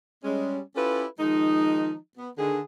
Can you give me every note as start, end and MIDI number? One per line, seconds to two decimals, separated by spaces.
0.24 0.60 55
0.24 0.60 56
0.24 0.60 61
0.76 1.05 61
0.76 1.05 64
0.76 1.05 65
0.76 1.05 67
0.76 1.05 69
0.76 1.05 71
1.20 1.94 51
1.20 1.94 53
1.20 1.94 56
1.20 1.94 63
2.18 2.30 59
2.38 2.59 50
2.38 2.59 51
2.38 2.59 68